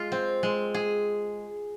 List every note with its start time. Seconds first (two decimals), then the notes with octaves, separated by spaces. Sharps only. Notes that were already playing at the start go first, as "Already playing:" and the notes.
Already playing: G#3 F4
0.12 C4
0.43 G#3
0.74 G#4